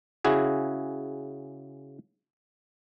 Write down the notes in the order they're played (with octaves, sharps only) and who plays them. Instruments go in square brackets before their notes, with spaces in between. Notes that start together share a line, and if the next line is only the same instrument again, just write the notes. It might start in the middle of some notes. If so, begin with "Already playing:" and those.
[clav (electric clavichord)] C#3 E4 F#4 G#4